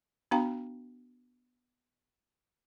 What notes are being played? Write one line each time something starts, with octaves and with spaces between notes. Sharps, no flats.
B3 D4 F#4 F5 G5 A#5